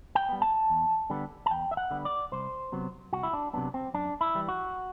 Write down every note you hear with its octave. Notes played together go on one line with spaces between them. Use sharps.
G5
G3 B3
A5
E2
D3 G3 B3
A5
E2 G5
E5
F#5
D3 G3 B3
D5
C2 C5
C3 F#3 B3
C2 F#4
E4
D4
C3 F#3 B3 D4
C4
F#2 D4
E4
E3 G3
F#4